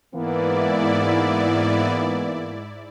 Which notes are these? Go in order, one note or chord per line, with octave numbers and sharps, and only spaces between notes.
G#2 E3 A#3 B3 E4 D5